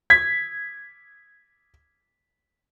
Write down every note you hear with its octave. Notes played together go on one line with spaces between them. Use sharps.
G#6 B6